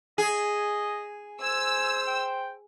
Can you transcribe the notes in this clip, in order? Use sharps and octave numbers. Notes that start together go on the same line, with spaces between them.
G#4 D#5
C5 G#5 E6
G5